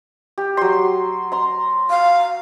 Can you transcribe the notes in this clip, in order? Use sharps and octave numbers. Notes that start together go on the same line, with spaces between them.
G4
F#3 C6
A#5 C6
F5